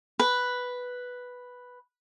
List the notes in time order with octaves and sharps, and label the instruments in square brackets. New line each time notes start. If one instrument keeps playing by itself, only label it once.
[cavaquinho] B4